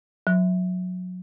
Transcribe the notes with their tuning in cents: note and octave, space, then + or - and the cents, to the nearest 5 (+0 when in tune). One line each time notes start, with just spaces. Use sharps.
F#3 -25